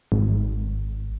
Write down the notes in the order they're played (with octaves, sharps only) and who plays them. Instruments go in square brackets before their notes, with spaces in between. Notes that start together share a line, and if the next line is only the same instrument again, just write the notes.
[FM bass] G#1